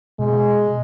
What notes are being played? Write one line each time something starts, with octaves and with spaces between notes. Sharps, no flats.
B2 G#3